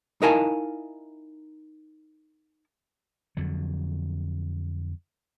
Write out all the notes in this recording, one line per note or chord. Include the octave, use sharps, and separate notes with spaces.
D#4 E4 A#4 F5 G#5 A5
F2 D3 F#3